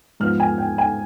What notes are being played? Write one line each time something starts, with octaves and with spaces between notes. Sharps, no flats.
G#2 F3 B3 F6
G#5
G5
G#5